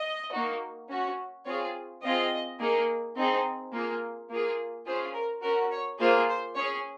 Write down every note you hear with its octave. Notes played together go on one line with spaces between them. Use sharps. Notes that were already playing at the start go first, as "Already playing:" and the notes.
Already playing: D#5
A#3 D#4 F#4
C#4 F#4
C4 F4 G#4 C#5
C4 F4 G#4 D#5
A#3 D#4 G#4
C4 D#4 G#4
A#3 F4 G#4
A#3 F4 G#4
C#4 F4 G#4 C5
A#4
C#4 F#4 A#4
C#5
A#3 F4 G#4 C5
C5
C#4 G#4 C#5